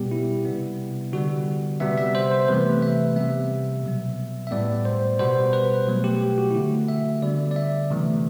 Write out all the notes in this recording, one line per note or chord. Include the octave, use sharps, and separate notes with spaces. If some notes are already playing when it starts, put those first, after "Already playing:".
Already playing: B2 G3 B3 G4
E4
C3 G3 B3
D3 G3 B3 F#4
C3 G3 B3 E5
E5
C5
C5
C3 E3 A3 B4
E5
C3 G3 B3 E5
B2 F#3 B3
E5
A2 G3 B3 D5
C5
B2 G3 B3 C5
B4
B2 F#3 A3
G4
G4
F#4
E4
D3 A3 F#4
E5
D3 G3 B3 D5
D5
E5
C3 E3 A3